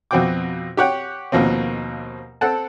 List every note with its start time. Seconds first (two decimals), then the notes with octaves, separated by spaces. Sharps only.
0.11 F2 B2 C4 F#4 G5 D6
0.77 G4 C#5 F#5 G5
1.32 D#2 B2 F3 A#3 C4
2.41 C4 A4 F#5 A5